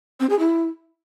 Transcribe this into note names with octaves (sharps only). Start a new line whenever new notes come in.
C4
G#4
E4